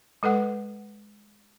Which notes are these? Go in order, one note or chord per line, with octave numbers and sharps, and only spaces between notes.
G#3 A4 B4 F#5